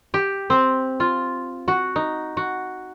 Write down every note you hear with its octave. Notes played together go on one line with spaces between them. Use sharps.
G4
C4
F4
F#4
D#4
F#4